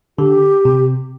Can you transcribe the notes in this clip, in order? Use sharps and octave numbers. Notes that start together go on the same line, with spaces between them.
D3 G4
C3